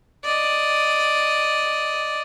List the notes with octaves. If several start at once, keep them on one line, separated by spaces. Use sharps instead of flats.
D5 D#5